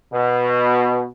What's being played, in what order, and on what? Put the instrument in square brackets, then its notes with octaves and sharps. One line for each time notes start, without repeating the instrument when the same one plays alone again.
[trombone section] B2